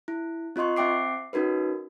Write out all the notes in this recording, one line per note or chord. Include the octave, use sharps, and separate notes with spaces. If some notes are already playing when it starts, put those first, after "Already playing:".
E4
C4 F4 D#5 C6 C#6
C4 E5 G5 D6 C7
C#4 D#4 F#4 A#4 B4